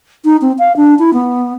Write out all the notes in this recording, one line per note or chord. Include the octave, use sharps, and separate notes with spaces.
D#4
C4
F5
D4
E4
B3